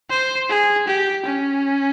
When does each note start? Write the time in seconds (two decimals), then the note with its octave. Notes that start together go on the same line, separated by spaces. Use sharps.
0.10 C5
0.49 G#4
0.87 G4
1.26 C#4